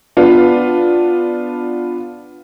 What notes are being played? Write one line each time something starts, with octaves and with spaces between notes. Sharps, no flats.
B3 D4 F4